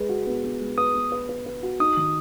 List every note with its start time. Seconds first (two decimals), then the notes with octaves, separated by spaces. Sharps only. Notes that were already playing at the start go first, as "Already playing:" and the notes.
Already playing: G#3 B4
0.09 F#4
0.27 B3
0.44 B3
0.61 G#3
0.78 B4 D#6
0.94 B3
1.12 B4
1.29 B4
1.46 B4
1.63 F#4
1.80 D#4 D#6
1.97 D#3